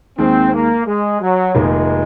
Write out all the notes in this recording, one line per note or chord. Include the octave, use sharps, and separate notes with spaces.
D#2 D#3 G#3 C4
A#3
G#3
F#3
F1 F2 D#3 G#3 A#3